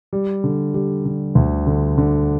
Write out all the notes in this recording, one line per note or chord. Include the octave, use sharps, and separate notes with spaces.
G3
D3
G3
D3
D2
D3
D3